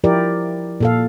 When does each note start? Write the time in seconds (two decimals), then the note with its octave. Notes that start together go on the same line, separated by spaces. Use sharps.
0.04 F3 E4 G4 A#4 D5
0.80 A#2 A4 F5